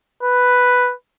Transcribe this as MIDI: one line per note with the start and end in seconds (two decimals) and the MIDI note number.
0.23 0.92 71